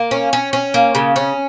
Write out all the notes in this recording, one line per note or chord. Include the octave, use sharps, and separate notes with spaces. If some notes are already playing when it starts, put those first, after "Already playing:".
Already playing: A#3
C#4
C#4
C#4
A#3
C#3
C#4